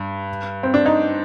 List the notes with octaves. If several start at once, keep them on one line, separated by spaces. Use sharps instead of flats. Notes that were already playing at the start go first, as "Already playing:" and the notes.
Already playing: G2
C4
D4
D#4